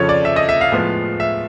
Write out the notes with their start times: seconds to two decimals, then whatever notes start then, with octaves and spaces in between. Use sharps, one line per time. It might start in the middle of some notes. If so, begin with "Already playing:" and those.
Already playing: F2 C#3 F3 A4 C#5
0.09 D5
0.25 E5
0.36 D#5
0.49 E5
0.61 F5
0.72 A2 F3 G#3 B3
1.20 E5